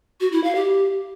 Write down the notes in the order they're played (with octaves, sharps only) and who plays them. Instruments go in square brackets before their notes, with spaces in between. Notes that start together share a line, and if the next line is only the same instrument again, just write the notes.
[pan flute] F#4
E4
F5
G4